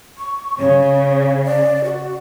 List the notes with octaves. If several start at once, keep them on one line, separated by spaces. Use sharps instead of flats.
C#6
C#3 C#5
D5
F#4